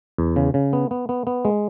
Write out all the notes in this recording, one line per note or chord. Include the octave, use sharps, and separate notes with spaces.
E2
C#3
C#3
B3
B3
B3
B3
G#3